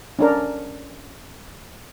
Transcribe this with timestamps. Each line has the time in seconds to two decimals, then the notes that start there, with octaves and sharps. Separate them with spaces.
0.19 C#4 D4 A#4